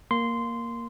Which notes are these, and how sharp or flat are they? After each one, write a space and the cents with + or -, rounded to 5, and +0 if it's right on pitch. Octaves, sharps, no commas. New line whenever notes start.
A#3 +0 C6 -10